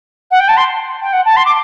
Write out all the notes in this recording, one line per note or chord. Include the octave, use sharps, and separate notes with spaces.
F#5
G5
A5
C6
G5
F#5
A5
C6
D6